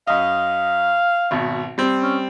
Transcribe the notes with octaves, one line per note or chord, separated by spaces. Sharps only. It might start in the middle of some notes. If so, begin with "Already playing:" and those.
F#2 D#5 F5
G#1 B2
G3 C4
C#4